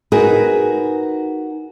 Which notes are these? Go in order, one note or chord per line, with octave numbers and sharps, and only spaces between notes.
D#4 F#4 G#4 A#4 B4